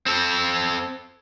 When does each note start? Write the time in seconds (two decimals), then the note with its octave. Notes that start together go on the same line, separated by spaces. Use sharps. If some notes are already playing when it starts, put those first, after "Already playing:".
0.06 C4 A4